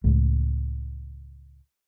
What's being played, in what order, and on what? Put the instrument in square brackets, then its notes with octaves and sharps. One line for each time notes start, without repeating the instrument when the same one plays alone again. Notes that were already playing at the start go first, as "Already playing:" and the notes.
[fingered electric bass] C#2 A2 C#3 G#3